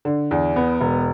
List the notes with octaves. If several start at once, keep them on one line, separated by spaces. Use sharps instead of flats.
D3
E2
B3
E1